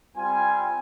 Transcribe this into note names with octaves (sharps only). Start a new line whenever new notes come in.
G3 C4 F4 G#5